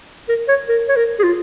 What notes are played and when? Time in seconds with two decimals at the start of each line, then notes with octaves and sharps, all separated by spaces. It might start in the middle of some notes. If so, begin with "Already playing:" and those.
0.29 A#4
0.48 C#5
0.69 A#4
0.89 C#5
0.96 A#4
1.19 G#4
1.24 F4